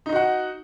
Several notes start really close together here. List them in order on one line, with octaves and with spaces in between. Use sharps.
D#4 D#5 F#4 F#5